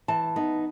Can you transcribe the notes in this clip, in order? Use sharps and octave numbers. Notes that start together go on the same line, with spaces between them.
E3 A5
B3 D#4